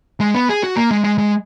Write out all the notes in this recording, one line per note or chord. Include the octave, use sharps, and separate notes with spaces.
G#3
B3
G#4
F#4
A#3
G#3
G#3
G#3